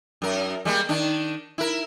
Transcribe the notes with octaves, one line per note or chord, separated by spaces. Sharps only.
F#2 A#4
G3 G#3 A#3
D#3 D4
E4 A#4